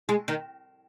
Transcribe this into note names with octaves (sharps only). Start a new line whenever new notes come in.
G#3
D#3